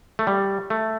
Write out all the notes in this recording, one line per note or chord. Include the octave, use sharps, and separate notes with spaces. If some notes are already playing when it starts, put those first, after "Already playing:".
A3
G3
A3